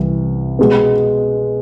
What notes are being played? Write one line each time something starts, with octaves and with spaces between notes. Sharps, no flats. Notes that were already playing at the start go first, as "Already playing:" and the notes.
Already playing: C2 C3 E3
B2 G#3 B3